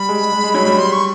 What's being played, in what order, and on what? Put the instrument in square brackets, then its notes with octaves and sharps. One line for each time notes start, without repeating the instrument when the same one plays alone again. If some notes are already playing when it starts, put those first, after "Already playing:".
Already playing: [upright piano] G3 [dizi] B5
[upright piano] G#3
G#3
G#3
F#3
G3
[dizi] C6
C#6